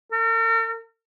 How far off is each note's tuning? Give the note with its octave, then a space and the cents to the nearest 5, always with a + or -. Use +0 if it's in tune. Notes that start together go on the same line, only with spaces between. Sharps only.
A#4 -45